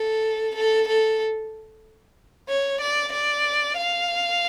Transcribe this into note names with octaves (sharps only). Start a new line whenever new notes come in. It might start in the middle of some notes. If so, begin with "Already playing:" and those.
Already playing: A4
A4
A4
C#5
D5
D5
F5